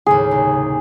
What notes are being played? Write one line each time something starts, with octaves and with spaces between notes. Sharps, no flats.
D#2 A2 C#3 G#4
C2